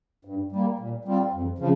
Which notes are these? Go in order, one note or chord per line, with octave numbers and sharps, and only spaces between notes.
G2
G3 A#3
A#2
G3 C4 F4
F2
C#3 F3